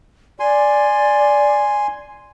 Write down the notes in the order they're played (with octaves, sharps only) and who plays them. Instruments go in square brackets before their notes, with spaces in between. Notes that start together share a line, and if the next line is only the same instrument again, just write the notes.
[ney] D5 [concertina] G#5 C6